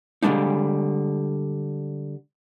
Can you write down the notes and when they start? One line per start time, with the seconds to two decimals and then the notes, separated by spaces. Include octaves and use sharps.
0.23 D3 G3 G#3 D4 D#4